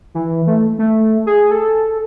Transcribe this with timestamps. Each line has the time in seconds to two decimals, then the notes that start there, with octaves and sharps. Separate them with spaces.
0.15 E3
0.47 A3
0.79 A3
1.26 G#4
1.51 A4